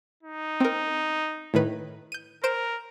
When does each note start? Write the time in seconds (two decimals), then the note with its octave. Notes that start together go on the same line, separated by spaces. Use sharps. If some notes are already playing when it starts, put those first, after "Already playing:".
0.23 D#4
0.60 C4 A#4
1.54 A2 D#3 B4
2.12 G6 D#7
2.44 A#4 C5 D7 E7